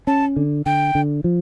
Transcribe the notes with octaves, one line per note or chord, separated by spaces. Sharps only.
C#4 A5
D3
D3 G5
D3
F3